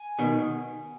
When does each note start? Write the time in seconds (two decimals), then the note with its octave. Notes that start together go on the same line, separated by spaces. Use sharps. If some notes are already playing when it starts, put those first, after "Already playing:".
Already playing: G#5
0.19 B2 D#3